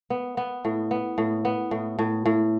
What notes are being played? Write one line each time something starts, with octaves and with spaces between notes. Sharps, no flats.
B3
B3
A2
B3
A2
B3
A2
A2
A2